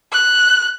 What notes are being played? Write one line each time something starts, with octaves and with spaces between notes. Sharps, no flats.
F#6